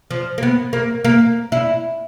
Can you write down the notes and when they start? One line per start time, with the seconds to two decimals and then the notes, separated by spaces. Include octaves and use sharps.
0.11 F3
0.38 A#3
0.43 B3
0.73 A#3
1.05 A#3
1.52 E4